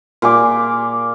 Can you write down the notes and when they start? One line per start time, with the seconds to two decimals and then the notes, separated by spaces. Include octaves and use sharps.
0.22 A#2 G#4 D6